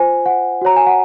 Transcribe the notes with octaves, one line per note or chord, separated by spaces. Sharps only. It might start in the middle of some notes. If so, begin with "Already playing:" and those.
Already playing: F4 C5 G#5
F#5
F#4 C#5 A#5
G#5
F#5